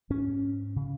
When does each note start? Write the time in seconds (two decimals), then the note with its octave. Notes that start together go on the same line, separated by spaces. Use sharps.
0.10 G#2 C#4
0.76 C#3